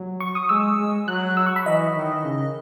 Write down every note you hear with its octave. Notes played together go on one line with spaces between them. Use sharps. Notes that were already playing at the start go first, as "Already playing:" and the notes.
Already playing: F#3
C#6
D#6
G#3 E6
G#3
F#3 F#6
E6
C#6
B5
E3 D#5
D#3
C#3